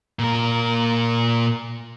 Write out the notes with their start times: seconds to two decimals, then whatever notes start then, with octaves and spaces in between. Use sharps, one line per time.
0.19 A#2 A#4